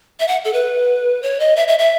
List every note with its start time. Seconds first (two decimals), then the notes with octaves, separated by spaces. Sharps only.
0.20 E5
0.28 F#5
0.45 A4
0.53 B4
1.23 C#5
1.40 D#5
1.56 E5
1.68 E5
1.79 E5